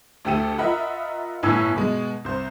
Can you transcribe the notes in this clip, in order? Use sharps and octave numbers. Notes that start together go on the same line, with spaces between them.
D2 A3 G4 A4 D#7
F4 A#4 D#5 E5 F#5 B5
G1 A2 G#5 E6 G#6
B2 G#3
C2 C5